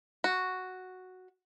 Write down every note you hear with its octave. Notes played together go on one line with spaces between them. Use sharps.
F#4